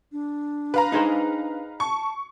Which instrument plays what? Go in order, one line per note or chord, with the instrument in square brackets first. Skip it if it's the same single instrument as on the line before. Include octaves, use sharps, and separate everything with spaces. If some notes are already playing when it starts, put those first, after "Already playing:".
[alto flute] D4
[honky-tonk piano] B4 F5 A#5
[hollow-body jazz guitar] D#4 G#4 C5
[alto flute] A5 [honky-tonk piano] C#6